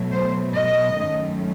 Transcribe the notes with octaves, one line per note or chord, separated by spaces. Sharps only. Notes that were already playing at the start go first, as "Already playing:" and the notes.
Already playing: B2 F#3 A3
C5
D#5
F#2 D#3 A3